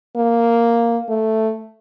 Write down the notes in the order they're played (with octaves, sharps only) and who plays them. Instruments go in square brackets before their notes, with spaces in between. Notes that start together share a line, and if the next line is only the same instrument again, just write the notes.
[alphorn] A#3
A3